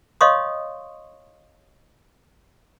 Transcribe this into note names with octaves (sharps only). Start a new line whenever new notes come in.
C#5 D#5 F5 C6 C#6 D#6